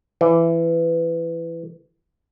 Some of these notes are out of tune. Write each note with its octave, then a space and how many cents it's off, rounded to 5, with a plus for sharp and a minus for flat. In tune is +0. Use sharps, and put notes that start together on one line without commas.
E3 +15